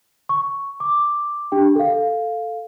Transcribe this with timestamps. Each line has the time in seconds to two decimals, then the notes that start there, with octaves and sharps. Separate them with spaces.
0.29 C#6
0.80 D6
1.52 D4 G4 G5
1.76 A4 F5